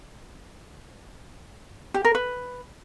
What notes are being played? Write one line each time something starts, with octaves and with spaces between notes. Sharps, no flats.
G4
A#4
B4